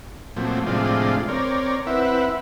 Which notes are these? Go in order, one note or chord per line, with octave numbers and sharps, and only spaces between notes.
A#2 F3 F#3 A3 C4
A2 C3 F3 G#3 D4 F4
C4 A#4 C#5 D5
C4 E4 B4 E5 F#5